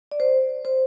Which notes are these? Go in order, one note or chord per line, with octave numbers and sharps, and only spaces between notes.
D5
C5
C5